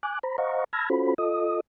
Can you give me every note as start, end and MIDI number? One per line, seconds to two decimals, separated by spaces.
0.03 0.19 80
0.03 0.19 86
0.03 0.19 90
0.23 0.37 72
0.23 0.37 82
0.23 0.37 83
0.38 0.64 72
0.38 0.64 75
0.38 0.64 77
0.38 0.64 78
0.38 0.64 82
0.38 0.64 85
0.73 0.89 81
0.73 0.89 83
0.73 0.89 88
0.73 0.89 89
0.73 0.89 92
0.73 0.89 94
0.90 1.14 61
0.90 1.14 65
0.90 1.14 66
0.90 1.14 69
0.90 1.14 72
0.90 1.14 83
1.18 1.60 65
1.18 1.60 69
1.18 1.60 75
1.18 1.60 87